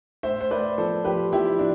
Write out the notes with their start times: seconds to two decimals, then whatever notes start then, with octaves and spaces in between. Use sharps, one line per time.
0.23 A2 C5 E5
0.41 C5
0.51 A2 B4 D5
0.78 F3 A4 C5
1.05 F3 G4 B4
1.33 F3 E4 G4
1.59 F3 D4